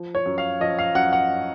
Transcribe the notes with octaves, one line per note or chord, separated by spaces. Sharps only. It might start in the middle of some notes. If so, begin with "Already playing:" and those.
Already playing: F3
C#5
F#2
F5
F3 D#5
F5
F#2 F#5
F#5